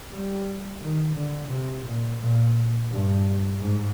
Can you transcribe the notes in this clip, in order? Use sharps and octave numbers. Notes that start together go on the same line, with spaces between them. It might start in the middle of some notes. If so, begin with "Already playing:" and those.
G3
D#3
D3
C3
A#2
A#2
G2
G#2